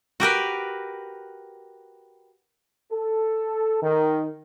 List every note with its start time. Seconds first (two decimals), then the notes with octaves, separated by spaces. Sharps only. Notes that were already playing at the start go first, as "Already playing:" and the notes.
0.20 F#4 G4 A#4 B4
2.90 A4
3.82 D#3